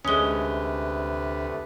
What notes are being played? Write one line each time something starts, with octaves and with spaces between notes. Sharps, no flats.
D2 C3 G#3 A3 C#4 B4 D#6 G7